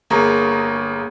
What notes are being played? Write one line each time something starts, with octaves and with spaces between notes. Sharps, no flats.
G1 A#3 G#4 A#5 C#6